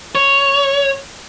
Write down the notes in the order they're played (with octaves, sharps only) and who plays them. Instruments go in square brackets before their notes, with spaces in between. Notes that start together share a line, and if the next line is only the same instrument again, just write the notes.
[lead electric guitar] C#5